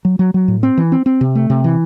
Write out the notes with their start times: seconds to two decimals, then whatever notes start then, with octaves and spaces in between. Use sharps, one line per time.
0.05 F#3
0.19 F#3
0.34 F#3
0.48 A2
0.63 C4
0.78 E3
0.92 C4
1.06 C4
1.21 C3
1.35 A3
1.50 C3
1.64 E3